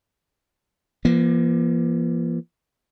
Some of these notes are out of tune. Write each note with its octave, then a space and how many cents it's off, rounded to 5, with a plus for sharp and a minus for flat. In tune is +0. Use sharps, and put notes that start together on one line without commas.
F3 -45 A#3 +30